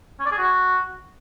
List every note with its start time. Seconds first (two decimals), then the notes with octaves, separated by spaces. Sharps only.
0.19 C#4
0.26 D5
0.32 G#4
0.38 F#4